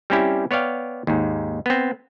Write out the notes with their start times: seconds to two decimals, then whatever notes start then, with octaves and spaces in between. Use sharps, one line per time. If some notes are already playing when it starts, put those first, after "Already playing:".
0.10 G3 C4 C#4 E4 G4
0.51 B3 C#5 D5 F5 G5
1.07 D#2 G#2
1.66 B3 C4